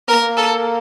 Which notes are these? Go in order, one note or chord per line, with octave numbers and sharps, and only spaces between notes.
A#3 A#4
A4